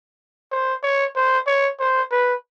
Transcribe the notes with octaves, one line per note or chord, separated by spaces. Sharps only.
C5
C#5
C5
C#5
C5
B4